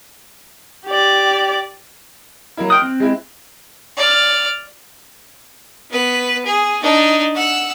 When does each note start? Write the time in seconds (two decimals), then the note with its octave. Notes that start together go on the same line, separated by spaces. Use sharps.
0.86 G4 D5
2.57 F#3 A#3 E4
2.70 G5 C6 D#6 F6 F#6
2.82 C4
3.00 G#3 E4
3.97 D5 F6
5.91 B3 B4
6.46 G#4
6.83 D4 D#4
7.35 F#5 E6